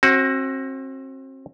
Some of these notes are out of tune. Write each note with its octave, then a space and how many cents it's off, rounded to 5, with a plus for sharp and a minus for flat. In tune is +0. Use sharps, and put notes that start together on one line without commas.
C4 +35 F#4 +0